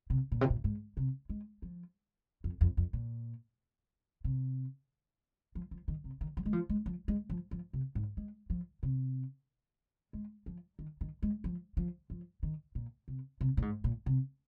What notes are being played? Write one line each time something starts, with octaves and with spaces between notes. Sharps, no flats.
C3
A#2
C3
A#2
G#2
C3
G#3
F3
F2
F2
F2
A#2
C3
F3
F3
D#3
C3
D#3
F3
G#3
F3
G#3
F3
G#3
F3
F3
C3
G#2
G#3
F3
C3
G#3
F3
D#3
D#3
G#3
F3
F3
F3
D#3
A#2
C3
C3
A#2
G#2
A#2
C3